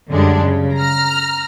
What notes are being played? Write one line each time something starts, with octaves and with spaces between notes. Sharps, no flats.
F#2 D3 G3 G#3 D4
C#3
A#5 F6